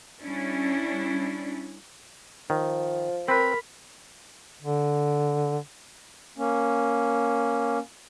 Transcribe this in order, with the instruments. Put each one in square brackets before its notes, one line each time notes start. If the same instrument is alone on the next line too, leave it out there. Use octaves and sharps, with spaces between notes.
[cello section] G3 C#4 D4 E4
[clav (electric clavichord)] D#3 [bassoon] F3
[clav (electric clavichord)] C4 B4 [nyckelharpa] A#4 B5
[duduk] D3
[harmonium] A#3 C#4